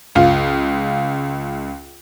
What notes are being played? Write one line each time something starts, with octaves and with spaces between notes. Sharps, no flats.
C#2 F4